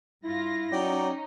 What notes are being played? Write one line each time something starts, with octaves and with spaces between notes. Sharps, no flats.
G2 E4 F4 A#6
F#3 C#4 D#4 D5 G5